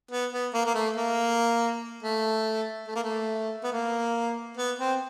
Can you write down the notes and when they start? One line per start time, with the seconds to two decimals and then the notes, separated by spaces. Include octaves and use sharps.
0.11 B3
0.33 B3
0.54 A#3
0.66 A#3
0.74 A3
0.96 A#3
2.03 A3
2.87 A3
2.96 A#3
3.03 A3
3.64 B3
3.72 A#3
4.57 B3
4.79 C4